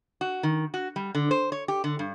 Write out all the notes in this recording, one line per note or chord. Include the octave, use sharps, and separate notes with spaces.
F#4
D#3
F#4
G3
D3
C5
C#5
G4
D3
G2